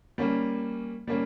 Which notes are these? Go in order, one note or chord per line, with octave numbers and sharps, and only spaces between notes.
G3 A#3 C#4
G3 A#3 C#4